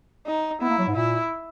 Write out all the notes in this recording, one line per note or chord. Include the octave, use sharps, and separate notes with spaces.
D#4
B3 E4
A#3
F#3
G#2
A#2 E4